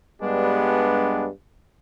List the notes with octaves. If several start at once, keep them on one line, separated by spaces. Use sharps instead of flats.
G2 G3 G#3 B3 D4